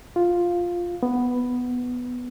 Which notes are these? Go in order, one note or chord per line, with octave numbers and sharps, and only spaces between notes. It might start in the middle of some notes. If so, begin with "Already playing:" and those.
F4
B3